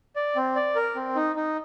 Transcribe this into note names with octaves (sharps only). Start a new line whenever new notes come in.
D5
C4
D5
A#4
C4
D#4
D#4